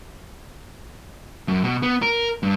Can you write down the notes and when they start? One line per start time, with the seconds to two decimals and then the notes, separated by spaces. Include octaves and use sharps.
1.48 F#2
1.64 B2
1.83 B3
2.02 A#4
2.43 G2